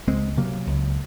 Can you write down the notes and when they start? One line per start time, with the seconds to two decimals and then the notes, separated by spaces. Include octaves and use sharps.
0.07 C#2 G#3 C4
0.37 C3 F#3 A#3
0.67 C#2